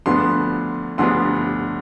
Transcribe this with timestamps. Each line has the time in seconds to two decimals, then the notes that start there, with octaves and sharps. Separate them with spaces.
0.06 D2 D3 F3 B3 D4 C6
0.98 D2 D3 F3 B3 D4 C6